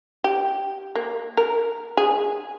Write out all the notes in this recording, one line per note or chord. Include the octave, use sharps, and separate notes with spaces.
G4
A#3
A#4
G#4